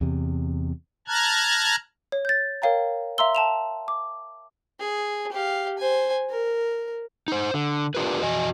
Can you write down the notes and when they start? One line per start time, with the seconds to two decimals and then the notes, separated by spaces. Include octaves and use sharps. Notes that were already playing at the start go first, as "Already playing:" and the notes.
0.01 E2 C3
1.08 A5 A#5 F6 F#6 G#6
2.12 C#5
2.25 G6 A6
2.62 A#4 C#5 F5 G5 A#5
3.18 E5 F5 A#5 C6 E6 G7
3.35 G5 A5 E7 F7
3.88 D6
4.80 G#4
5.32 G4 F5
5.78 C5 G#5
6.30 A#4
7.28 D#4 C5
7.54 D3
7.95 D4 F4 G4 A#4 B4
8.22 F2 F#4 D#5 G#5